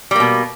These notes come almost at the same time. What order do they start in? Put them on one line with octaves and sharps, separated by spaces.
G3 A#3 B2